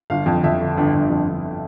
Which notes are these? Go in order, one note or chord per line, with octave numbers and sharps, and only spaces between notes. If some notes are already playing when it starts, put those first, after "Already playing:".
G1 F5
F2
F2 E5
D3
G1
G1
F2
G1